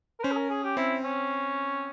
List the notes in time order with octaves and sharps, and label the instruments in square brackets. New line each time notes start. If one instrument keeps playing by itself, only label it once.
[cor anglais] A#4
[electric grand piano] C#4 [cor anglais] C5
[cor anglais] G#4
A#4
G#4
G4
[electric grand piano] C4 [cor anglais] E4
[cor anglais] C#4